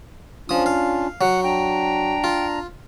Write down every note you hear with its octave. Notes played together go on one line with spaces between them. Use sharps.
F3 C#4 D4 F4 D#6
F5
F#3 F#5
D4 G5 A#5
F4